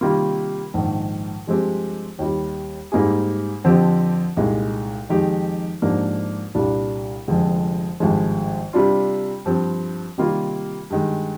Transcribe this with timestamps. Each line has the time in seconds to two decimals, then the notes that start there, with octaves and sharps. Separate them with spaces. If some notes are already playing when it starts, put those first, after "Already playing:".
0.01 C3 D#3 G3 A#3 F4
0.74 A#1 G#2 D#3
1.47 G2 F3 G#3 C4 G4
2.19 D#2 D#3 G3
2.92 G#2 G3 A#3 D#4 G#4
3.64 F2 D3 F3 C4 G4
4.37 C2 A#2 G#3 D#4
5.09 F2 D#3 G#3 D#4 G4
5.82 G#2 F3 A#3 D4 G4
6.55 C2 A#2 G3 D4
7.28 F1 F2 D3 F3 G#3
8.00 G#1 G2 F3 G#3
8.73 C3 G3 D4 F4
9.45 G2 F3 C4
10.18 C3 D#3 G3 A#3 F4
10.90 G2 D#3 G#3